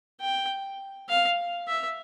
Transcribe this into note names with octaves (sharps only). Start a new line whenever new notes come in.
G5
F5
E5